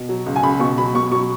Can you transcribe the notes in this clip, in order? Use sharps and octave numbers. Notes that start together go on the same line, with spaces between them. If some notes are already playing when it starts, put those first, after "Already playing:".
Already playing: B2
F#3
C#2
G#5
C#2 B5
B2 C#6
F#3 B5
B2 C#6
F#3 C#6